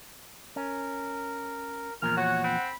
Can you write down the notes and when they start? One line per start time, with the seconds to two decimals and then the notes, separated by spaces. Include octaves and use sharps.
0.56 C#4 A#4
2.02 E2 A#2 F3 A#4 F6
2.17 F#4 C#5 F#5
2.44 C4 B5